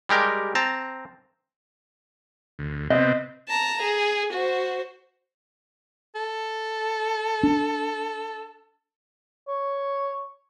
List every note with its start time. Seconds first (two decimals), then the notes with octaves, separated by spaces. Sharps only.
0.09 G3 G#3 G4 A#4
0.55 C4 A5 A#5
2.59 D2
2.90 C3 B3 C4 D#5
3.48 A5 A#5
3.82 G#4
4.32 F#4 C5
6.15 A4
7.43 D4
9.48 C#5